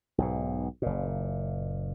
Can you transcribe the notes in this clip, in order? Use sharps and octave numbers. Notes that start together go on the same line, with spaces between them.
B1 G#2 B2
F#1 A#2